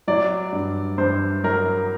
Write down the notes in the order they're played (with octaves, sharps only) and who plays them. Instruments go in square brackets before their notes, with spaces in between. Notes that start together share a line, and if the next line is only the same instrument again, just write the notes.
[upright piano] F#3 D5
G2
G2 C5
F#3 A#4